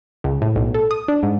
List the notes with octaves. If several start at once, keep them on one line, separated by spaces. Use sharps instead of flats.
C#2
A2
B1
A4
D#6
D4
G#2